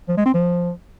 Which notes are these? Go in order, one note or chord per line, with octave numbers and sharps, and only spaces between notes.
F3
G#3
C4
F3